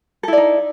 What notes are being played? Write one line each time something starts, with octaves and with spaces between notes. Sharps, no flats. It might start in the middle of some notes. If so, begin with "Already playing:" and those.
D#4 E4 A4 D5